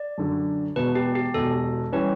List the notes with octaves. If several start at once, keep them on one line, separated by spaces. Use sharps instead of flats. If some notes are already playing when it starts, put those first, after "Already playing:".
Already playing: D5
F#2 D3 F#3
E1 E2 B2 B4
G4
G4
E1 E2 B2 A4
E3 G3 C#4 B4